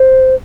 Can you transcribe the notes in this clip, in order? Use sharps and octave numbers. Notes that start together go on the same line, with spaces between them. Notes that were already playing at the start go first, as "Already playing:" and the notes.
Already playing: C5